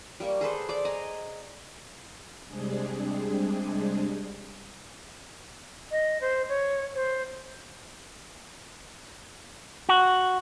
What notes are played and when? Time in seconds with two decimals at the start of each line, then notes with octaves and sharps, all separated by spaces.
0.20 G3 A#3 C#6
0.41 G#4 A4 B4 C5
0.69 C5 D5 D6
0.85 D#5 G#5 A#5
2.46 C3 G3 G#3 C4 D4 G#4
5.91 D#5
6.21 C5
6.49 C#5
6.95 C5
9.89 F#4